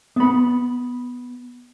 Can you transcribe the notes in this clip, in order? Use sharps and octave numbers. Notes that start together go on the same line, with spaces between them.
B3 B5